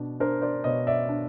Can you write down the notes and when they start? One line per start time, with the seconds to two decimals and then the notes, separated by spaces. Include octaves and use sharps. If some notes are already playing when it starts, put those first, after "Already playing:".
Already playing: B2 D4
0.20 D4 A#4 C5
0.42 C5 D5
0.64 B2 C#5 D#5
0.87 D5 E5
1.09 D4